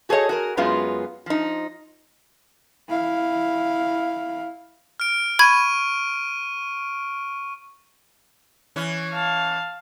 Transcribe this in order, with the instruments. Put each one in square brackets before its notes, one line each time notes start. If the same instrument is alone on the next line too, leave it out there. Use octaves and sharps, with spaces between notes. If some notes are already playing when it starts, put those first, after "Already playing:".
[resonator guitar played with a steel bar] F#4 G#4 A4 C5 C#5 D#5
F#4 G#4 A#4
F#2 F#3 G#3 B3 F4
F3 D#4
[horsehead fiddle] E4 F5
[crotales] F6 D7
[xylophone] B5 G#6 [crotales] C#6 D#7
[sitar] E3 C#4
[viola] F5 A5